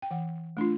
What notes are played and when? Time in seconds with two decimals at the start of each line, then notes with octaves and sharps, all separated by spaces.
0.02 G5
0.11 E3 F#5
0.57 A3 D4 F4